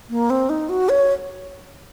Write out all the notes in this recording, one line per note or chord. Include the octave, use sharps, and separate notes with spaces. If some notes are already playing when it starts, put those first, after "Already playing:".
A#3
C4
D#4
F#4
C#5